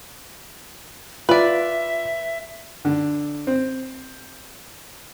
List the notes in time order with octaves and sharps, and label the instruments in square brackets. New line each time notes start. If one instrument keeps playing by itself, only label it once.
[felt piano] F4 [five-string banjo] B4 D5 [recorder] E5
[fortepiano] D3
C4